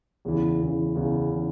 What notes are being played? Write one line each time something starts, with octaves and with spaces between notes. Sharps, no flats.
E2 C#3 E3
E2 C#3 E3
E2 C#3 E3
C#3 E3